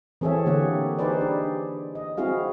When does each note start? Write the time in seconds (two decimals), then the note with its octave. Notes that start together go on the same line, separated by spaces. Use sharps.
0.21 E3 C4 G#4 A4 C#5 E5
0.46 D3 A#3 G4 C#5 F#5
0.99 D#4 G4 G#4 B4 C5 D5
1.21 D4
1.95 D#5
2.17 C4 E4 F#4 G#4 F5